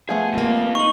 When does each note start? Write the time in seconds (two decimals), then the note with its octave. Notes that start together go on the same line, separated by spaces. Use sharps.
0.09 F3 A3 B3 G#4
0.34 G3 A#3 C4 F4
0.75 D#4 C#6 F#7